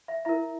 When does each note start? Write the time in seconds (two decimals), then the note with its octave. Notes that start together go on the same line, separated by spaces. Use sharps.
0.08 E5
0.25 E4 A#4 E5